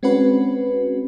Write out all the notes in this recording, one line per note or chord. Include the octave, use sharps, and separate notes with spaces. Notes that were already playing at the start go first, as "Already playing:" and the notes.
G#3 C4 C#4 F#4 B4